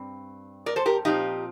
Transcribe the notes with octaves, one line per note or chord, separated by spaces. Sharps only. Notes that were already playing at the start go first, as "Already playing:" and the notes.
Already playing: G2 C4
A#4 D5
A4 C5
G4 A#4
A#2 F3 C4 D#4 G4